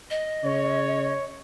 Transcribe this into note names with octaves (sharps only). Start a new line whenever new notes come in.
D#5
C#3 C#5